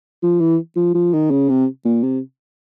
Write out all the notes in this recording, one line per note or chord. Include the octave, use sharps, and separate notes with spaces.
F3
E3
F3
F3
D#3
C#3
C3
A#2
C3